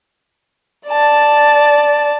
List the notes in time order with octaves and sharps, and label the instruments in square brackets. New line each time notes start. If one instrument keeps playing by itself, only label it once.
[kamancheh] D5 A5